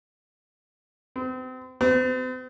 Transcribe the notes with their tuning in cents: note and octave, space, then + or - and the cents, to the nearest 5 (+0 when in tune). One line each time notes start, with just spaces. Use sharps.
C4 -35
C4 -45